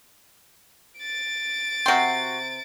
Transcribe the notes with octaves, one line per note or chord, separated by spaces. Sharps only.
A6 D7
C3 F#4 G5 C6